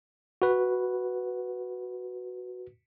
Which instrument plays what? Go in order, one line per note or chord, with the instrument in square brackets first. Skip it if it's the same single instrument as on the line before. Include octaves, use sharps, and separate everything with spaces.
[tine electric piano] F#4 B4